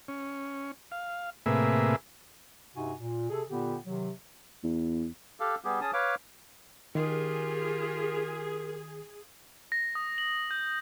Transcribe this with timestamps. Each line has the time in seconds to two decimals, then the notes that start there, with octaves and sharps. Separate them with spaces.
0.08 C#4
0.92 F5
1.46 A2 C3 A#3 G#4 B4 E5
2.75 G2 C3 D#4 F#4 G#5
2.99 A#2
3.30 C3 G#4 A4
3.49 A#2 D3 B3 G4
3.85 C3 D#3 F#3
4.64 E2
5.40 G4 A4 F5
5.65 G3 B3 G4 G#4
5.81 C#4 G#4 A5 D#6
5.93 B4 C#5 F5 D6
6.95 D#3 F4 G4 G#4 A#4
9.72 A#6
9.95 D#6
10.18 F#7
10.51 G6